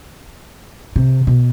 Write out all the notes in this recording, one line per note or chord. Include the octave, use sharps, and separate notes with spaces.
C3
B2